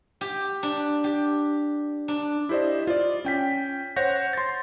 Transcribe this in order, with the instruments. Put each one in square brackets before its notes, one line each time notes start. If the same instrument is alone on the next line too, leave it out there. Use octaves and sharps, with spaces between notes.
[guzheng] G4
D4
G4
D4
[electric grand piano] E4 G4 C5 D5 D#5
F4 D5
C#4 G5 B6
C5 C#5 F#5 G6 A#6
C6 A6